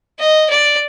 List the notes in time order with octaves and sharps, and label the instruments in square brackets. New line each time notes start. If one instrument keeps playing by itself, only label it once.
[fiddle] D#5
D5